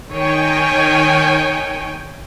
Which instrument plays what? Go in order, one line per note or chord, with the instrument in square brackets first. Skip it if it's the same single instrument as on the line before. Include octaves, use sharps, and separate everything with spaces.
[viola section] D#3 C#5 G5 G#5